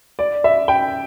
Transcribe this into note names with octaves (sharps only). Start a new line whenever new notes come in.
D5
E5
G5